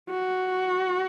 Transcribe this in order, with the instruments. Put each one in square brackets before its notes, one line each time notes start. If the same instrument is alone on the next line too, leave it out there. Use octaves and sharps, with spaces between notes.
[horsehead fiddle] F#4